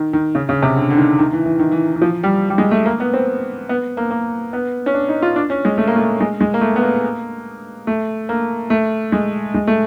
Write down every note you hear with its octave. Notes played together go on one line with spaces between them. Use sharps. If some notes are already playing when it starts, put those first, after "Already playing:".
Already playing: D#3
D#3
C#3
C#3
C3
D3
D3
D#3
D#3
E3
E3
D#3
E3
E3
F3
G3
G3
G#3
A3
A#3
B3
C4
B3
A#3
A#3
B3
C#4
D4
D#4
F4
D4
C#4
G#3
A3
A#3
A3
G#3
G#3
A#3
A3
B3
A#3
A3
A#3
A3
G#3
G#3
A3